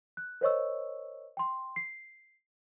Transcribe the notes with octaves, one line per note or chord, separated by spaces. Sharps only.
F#6
A#4 C5 C#5 D#5 C#6 E6
G5 C6
C7